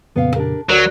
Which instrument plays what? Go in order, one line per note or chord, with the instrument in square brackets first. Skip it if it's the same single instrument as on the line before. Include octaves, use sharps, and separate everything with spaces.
[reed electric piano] F2 A#2 C#3 [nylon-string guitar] B3 F5
[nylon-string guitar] D4 G4 A#4
[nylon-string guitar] D2 A#4 [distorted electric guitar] F#3 [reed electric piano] F#4 D5 F#6